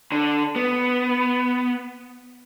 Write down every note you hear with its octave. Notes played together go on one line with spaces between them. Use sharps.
D3
B3